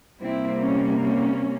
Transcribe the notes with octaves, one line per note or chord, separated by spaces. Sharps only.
C3 G3 A#3 C4 E4
C#4
C#4